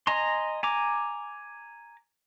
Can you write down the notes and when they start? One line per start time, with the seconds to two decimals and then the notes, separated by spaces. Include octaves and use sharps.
0.07 D#5 G#5 A#5 C6
0.63 G#5 A#5 D6